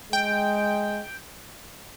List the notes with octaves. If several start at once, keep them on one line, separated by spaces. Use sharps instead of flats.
G#3 G5